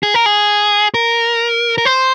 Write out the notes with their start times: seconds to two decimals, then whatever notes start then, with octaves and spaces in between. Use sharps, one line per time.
0.03 G#4
0.14 A#4
0.26 G#4
0.94 A#4
1.78 A#4
1.85 C5